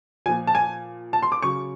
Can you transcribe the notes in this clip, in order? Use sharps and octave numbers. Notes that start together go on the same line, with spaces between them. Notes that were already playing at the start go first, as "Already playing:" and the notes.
A#2 F3 G#5
A5
G#5
A5
C6
D6
C#3 F#3 C#6